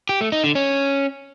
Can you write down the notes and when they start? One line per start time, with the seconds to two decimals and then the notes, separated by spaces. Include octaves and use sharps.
0.09 G4
0.21 A3
0.32 D#4
0.44 D3
0.55 C#4